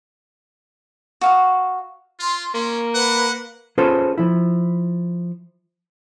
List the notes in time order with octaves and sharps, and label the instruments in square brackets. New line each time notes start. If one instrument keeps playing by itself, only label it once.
[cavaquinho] F#4 F5 D#6
[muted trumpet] F4 [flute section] C6
[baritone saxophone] A#3 [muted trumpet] C#4
[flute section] B4 [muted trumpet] F#5
[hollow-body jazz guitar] C#4 F4 G#4 A4 B4 C5
F3 E4